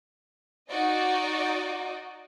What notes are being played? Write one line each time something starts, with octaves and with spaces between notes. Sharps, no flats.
D#4 F#4 D5 D#5